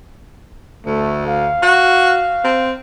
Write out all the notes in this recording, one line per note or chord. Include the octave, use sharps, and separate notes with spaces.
D2 A3
F5
F#4
C4